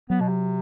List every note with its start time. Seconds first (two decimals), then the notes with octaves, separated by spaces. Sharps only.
0.10 F#3 B3
0.20 B2
0.28 C3